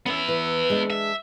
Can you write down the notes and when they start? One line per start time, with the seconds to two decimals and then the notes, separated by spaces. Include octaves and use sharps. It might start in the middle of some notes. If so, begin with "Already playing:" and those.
0.06 B3 C#4 E5
0.28 E3
0.70 G#3 D4
0.90 E5